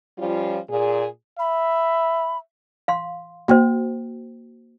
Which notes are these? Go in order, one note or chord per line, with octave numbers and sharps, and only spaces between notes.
F3 G3 C#4 F4
A#2 G#4
E5 B5
F5 C6
A#3 F#4 C5 G5